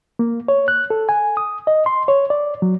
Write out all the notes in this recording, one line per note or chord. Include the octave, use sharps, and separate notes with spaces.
A#3
C#5
F#6
A4
G#5
D#6
D#5
C6
C#5
D5
F#3